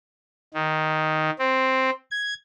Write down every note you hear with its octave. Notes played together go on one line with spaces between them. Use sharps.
D#3
C4
G#6